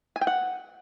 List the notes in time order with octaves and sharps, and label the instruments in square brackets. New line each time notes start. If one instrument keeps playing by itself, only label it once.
[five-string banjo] G#5
G5
F#5